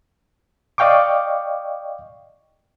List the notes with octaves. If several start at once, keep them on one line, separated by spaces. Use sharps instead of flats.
D5 D#5 F5 G5 C#6 D6